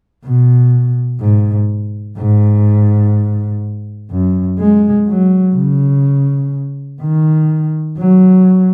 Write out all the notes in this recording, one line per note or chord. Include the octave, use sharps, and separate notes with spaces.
B2
G#2
G#2
F#2
G#3
F#3
C#3
D#3
F#3